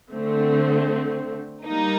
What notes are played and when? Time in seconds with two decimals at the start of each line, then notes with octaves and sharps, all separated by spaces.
0.10 D3 A3 C4
1.65 G3 A#3 D#4